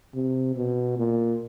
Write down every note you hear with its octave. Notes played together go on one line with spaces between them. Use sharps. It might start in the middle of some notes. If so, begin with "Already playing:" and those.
C3
B2
A#2